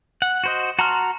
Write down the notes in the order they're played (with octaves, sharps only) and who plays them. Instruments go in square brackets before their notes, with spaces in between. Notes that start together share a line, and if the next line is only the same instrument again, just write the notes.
[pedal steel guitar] F#5
F#4 C5 D#5
F#4 A5 A#5 C6 F6